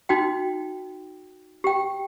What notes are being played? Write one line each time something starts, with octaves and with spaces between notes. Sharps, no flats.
D#4 F#4 G5
G4 G5